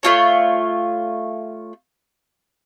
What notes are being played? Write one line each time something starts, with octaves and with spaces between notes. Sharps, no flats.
A3 C#4 F4 C#5